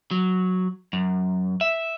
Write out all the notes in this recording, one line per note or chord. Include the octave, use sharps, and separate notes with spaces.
F#3
F#2
E5